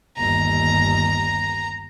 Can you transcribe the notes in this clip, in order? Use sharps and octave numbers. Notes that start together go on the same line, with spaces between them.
G1 D#2 A#5